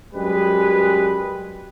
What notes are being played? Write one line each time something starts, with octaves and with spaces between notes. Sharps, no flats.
F#2 G3 G#3 G4 B4